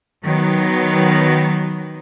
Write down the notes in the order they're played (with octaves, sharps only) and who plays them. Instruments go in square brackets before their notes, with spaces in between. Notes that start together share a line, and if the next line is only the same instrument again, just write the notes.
[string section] D#3 F#3 B3